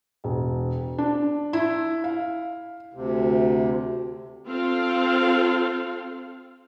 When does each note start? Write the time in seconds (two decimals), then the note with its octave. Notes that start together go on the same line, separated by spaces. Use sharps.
0.24 E1
0.98 D4
1.53 E4
2.04 F5
2.94 D2 C3
4.47 C4 F4 A4 F5